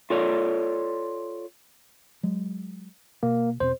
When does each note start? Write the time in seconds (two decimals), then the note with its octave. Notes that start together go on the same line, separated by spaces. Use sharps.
0.10 F4 A4 C#5 D5
2.23 F#3 G#3
3.23 B2 A#3
3.60 E2 B2 C4 C5